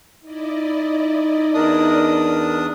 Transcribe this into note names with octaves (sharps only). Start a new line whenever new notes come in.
D#4 E4 D5 D#5
E2 D4 A#4 D#6